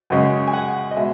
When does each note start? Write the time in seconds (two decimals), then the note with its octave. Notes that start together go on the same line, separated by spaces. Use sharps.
0.10 F#2 C#3 G#3
0.47 G#5
0.53 F#5
0.91 D#5
0.96 B2 G#3 E5